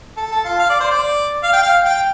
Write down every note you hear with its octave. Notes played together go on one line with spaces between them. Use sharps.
A4
A4
F4
F5
D5
C5
D5
F5
G5
F5
G5